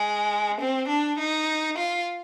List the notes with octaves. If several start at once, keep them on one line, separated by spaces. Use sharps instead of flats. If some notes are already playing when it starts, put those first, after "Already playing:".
Already playing: G#3
C4
D4
D#4
F4